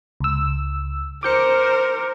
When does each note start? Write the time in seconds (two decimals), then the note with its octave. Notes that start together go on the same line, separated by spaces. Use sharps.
0.20 C#2 E6
1.23 A#4 C5 D6 G6 C#7